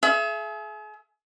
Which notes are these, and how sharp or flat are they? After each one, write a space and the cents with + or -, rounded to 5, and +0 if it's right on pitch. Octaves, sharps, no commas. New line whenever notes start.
G#4 +40 E5 +30